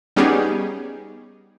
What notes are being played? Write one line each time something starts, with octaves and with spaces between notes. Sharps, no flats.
G3 B3 C#4 D#4 G4 G#4